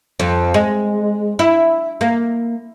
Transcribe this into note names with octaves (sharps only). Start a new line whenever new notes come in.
F2
G#3
E4
A#3